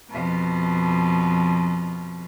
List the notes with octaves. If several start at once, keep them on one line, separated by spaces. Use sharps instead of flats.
F2 B2